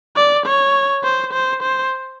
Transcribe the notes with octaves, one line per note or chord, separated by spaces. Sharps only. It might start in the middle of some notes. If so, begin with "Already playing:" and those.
D5
C#5
C5
C5
C5